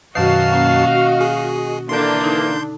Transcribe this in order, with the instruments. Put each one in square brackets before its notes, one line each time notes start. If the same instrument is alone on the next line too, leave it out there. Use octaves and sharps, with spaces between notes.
[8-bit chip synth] F#2 A5 C7 [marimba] B2 D#3 [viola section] F#4 D#5 [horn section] F5
[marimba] B2 A#3 C#4
[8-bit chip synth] G#4
[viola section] D3 D4 [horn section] E3 A#3 [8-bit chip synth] C6 G6
[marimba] D#4